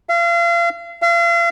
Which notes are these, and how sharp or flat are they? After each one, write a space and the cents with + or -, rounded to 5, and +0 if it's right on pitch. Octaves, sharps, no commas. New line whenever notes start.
F5 -35
F5 -40